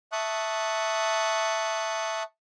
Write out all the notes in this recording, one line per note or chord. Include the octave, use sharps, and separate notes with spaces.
E5 A5 C#6 D#6 F#6